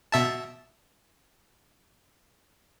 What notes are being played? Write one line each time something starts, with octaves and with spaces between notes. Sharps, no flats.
B2 E5 A5